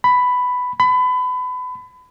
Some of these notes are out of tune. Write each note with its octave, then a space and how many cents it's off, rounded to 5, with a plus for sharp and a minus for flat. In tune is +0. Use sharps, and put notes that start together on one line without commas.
B5 +10
B5 +30